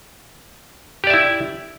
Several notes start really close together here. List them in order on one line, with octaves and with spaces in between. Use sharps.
G4 D5 E5 E4